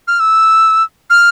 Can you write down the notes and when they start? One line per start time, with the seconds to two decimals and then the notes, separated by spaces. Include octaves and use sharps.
0.08 F6
0.20 E6
1.10 F6